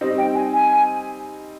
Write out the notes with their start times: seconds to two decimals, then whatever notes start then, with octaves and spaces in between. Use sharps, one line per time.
0.01 G3 C4 D#4 D#5
0.18 G5
0.34 G#5
0.52 G#5